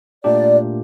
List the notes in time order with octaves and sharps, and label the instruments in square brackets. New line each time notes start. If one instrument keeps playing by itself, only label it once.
[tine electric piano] A#2 A3 D4 G4 [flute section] D5